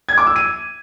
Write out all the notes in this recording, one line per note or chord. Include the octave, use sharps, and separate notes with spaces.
G#6
D6
E6
D#7